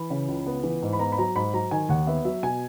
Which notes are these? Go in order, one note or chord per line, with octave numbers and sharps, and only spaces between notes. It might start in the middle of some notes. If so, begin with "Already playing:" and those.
Already playing: E3 B5
C#3
C#2
B3
E3
G#2
B5
B3 A#5
B5
F#3 A#5
G#2 B5
F#3 A#5
D#3 G#5
D#2 F#5
B3 E5
F#3 E5
B2 G#5